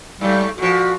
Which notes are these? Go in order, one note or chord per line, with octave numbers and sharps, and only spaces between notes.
G#2 G3 A3
A#2 F3 F#4